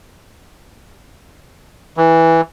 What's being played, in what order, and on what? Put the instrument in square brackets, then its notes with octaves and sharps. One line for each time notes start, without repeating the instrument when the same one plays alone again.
[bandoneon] E3